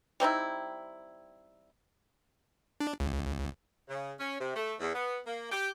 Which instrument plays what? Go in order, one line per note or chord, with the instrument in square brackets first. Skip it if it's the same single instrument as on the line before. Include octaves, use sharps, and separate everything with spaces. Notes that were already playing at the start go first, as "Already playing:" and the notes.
[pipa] G3 C4 D#4 E4
[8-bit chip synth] D4
C#2
[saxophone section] C#3
C#4
C3
A3
E2
B3
A#3
G4